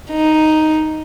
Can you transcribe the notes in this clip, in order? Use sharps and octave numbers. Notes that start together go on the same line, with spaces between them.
D#4